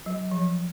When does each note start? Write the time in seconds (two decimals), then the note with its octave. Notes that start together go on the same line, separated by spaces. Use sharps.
0.06 F#3
0.31 F3